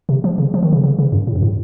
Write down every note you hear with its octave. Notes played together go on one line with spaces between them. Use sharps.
C3
F3
C#3
F3
D#3
C#3
C#3
C#3
F#2
A2
F#2
A2